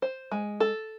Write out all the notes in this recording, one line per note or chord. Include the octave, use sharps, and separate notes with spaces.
C5
G#3
A4